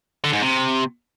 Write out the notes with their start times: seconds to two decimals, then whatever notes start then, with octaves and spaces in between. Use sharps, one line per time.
0.24 D3
0.33 G#2
0.42 C3